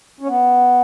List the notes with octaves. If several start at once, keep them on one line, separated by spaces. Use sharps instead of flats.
C#4
B3